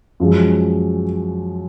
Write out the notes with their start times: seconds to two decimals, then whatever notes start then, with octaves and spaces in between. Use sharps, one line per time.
0.20 F#2 F3 G#3